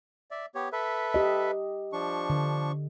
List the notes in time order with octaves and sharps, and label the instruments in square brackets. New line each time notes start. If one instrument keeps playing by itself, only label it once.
[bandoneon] D5 E5
B3 G4 C#5
A4 B4 E5
[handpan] G4 D#5
[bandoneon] F3 D4 C#6
[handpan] D3